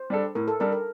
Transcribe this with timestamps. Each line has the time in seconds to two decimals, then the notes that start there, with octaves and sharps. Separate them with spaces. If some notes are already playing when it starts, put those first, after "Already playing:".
Already playing: C5
0.10 G3 D4 A4
0.35 A2 A#4
0.48 A4
0.60 G3 D4 A4 A#4
0.72 A#4